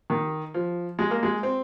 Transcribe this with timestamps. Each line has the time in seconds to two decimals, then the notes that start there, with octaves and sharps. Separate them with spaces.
0.10 D#3
0.54 F3
0.99 G#3
1.11 A#3
1.23 G#3
1.43 C4